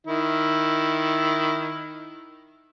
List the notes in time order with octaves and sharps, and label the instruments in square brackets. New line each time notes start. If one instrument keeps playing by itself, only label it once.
[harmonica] D#3 E4